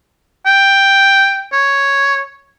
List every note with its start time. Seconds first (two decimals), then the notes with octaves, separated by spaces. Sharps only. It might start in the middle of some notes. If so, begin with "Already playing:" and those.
0.46 G5
1.53 C#5